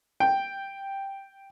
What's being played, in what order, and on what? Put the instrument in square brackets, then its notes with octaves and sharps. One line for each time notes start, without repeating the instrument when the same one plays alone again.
[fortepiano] G5